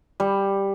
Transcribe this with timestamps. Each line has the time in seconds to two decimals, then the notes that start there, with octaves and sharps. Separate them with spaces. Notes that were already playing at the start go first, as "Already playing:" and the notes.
0.20 G3